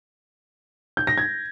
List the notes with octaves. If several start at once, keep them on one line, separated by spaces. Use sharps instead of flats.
G6
A#6
G#6